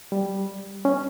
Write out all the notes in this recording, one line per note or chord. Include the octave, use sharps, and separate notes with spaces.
G3
C#4